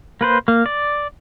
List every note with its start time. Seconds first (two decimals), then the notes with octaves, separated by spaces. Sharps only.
0.21 A#3 B4 C5
0.48 A#3
0.66 D5